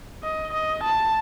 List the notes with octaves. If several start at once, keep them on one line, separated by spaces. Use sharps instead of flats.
D#5
D#5
A5